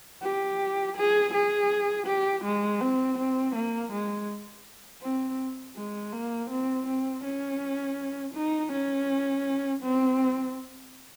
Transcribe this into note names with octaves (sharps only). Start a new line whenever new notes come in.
G4
G#4
G#4
G4
G#3
C4
C4
A#3
G#3
C4
G#3
A#3
C4
C4
C#4
D#4
C#4
C4